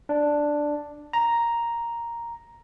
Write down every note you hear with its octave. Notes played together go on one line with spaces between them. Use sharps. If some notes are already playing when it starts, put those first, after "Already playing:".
D4
A#5